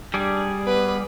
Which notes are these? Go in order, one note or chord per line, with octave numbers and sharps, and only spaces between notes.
G3 D4 G#4 D5
B3 B4